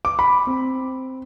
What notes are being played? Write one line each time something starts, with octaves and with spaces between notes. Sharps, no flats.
D6
B5
C4